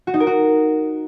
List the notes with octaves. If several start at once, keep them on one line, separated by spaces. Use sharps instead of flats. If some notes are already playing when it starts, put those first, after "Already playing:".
F#4
D#4
A#4
F#4